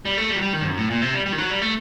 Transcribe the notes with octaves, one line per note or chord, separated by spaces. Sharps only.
G3
A3
G3
F#3
G3
D#3
G2
F#2
A2
A#2
C3
G3
G3
D#3
F#3
G3
A3